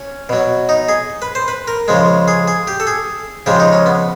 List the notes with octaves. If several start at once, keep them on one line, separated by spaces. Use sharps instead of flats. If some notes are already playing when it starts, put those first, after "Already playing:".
Already playing: C#4
B2 F#3
D#4
G#4
B4
C5
B4
A#4
C#3 F3 G#3
G#4
G#4
G4
A4
G#4
C#3 F3 G#3 G4
D#4
C#4
B3